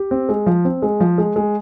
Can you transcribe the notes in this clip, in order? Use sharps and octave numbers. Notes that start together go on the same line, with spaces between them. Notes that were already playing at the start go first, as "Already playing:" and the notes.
Already playing: G4
C4
G#3
F3
C4
G#3
F3
G#3
G#3